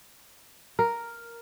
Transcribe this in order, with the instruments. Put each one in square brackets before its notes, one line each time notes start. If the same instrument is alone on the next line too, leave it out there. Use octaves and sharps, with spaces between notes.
[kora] A#4